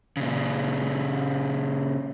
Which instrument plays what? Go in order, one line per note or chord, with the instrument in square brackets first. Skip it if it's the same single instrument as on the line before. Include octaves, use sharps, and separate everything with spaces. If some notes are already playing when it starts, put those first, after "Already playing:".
[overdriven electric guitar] A#2 C#3